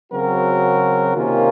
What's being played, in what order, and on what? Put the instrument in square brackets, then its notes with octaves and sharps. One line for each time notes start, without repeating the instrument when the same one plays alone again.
[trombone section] C#3 F#3 C4 F#4 A#4
C3 D#3 A#3 C#4 F4